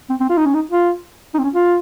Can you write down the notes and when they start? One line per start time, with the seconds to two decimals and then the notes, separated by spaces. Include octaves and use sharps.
0.10 C4
0.20 C4
0.29 F4
0.37 D#4
0.45 C#4
0.54 D#4
0.71 F4
1.34 D#4
1.39 C4
1.44 C#4
1.54 F4